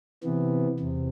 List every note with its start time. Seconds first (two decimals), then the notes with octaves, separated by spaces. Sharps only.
0.23 C3 E3 B3
0.80 E2 C3